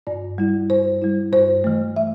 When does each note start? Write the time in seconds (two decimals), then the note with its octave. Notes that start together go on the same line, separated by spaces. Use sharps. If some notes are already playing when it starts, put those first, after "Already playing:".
0.07 G2 D5
0.38 G3 E4
0.70 G2 C5
1.02 G3 E4
1.33 G2 C5
1.64 E3 A3
1.96 E5